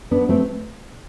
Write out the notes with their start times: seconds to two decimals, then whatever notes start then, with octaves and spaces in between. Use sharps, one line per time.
0.11 B3 D4
0.29 A3 C4